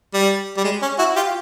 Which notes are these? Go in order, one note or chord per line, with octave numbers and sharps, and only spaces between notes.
G3
G3
G#3
C#4
E4 F#4
F4 G4